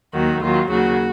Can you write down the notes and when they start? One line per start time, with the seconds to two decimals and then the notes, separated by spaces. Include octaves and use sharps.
0.14 D#2 D#3 F#3 F#4
0.42 D#2 D#3 F#3 F4
0.70 D#2 C#3 F#3 F#4